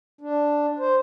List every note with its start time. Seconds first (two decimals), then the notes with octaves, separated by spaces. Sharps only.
0.21 D4
0.79 C5